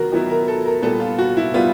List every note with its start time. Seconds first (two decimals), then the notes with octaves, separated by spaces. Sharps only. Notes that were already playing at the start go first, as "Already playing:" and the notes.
Already playing: D#3 F#3 B3 F#4 A#4
0.12 D#3 F#3 B3 E4
0.30 A#4
0.48 A4
0.66 A#4
0.82 A#2 G3 B3 A4
1.00 F4
1.18 F#4
1.37 E4
1.54 G3 B3 F4